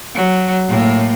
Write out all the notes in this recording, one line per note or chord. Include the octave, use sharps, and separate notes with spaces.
F#3
A2 A#3